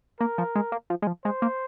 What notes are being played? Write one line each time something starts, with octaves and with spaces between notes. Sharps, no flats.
A#3 A#4
F3
G#3
A#3
F3
G#3
F3
G#3 C5
A#3